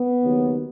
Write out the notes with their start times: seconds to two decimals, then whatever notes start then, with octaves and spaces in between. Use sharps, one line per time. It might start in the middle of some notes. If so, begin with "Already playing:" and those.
Already playing: B3
0.22 D#2 C#3 F#3